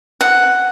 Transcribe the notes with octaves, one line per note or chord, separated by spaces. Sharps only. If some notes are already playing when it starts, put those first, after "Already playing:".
F#5